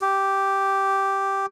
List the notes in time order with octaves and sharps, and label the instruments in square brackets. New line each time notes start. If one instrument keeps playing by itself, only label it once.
[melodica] G4